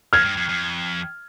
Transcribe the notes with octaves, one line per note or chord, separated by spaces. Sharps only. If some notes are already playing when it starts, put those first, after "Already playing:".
F2 F6 G#6
G2
F2
F2